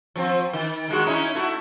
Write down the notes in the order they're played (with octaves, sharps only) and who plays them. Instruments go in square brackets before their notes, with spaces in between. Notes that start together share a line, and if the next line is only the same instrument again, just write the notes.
[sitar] F3 C4
D#3
D#3 G#3 F#4
C#4 D#4 E4
A3 E4 F#4